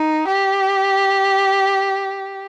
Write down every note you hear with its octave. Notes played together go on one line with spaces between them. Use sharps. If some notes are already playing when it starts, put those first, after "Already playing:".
Already playing: D#4
G4